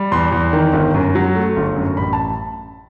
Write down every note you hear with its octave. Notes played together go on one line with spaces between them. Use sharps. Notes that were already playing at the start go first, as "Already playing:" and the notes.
Already playing: G3
E2 C6
E2
D#3
G1
F#2
F#3
A3
G1
F#2
A1 B5
A5